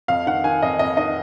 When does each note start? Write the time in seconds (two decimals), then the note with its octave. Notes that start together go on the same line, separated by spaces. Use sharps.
0.08 F2 F5
0.27 D#3 F#5
0.44 D#3 G#5
0.62 F2 D#5
0.79 F2 D#5
0.97 D#3 D#5